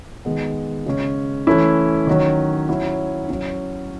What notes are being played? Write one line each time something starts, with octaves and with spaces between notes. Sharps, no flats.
D#3 G#3 B3
C#3 G#3 C#4
E3 A3 C#4 E4
D#3 F#3 C#4
F#3 C#4 E4
F#3 C#4 E4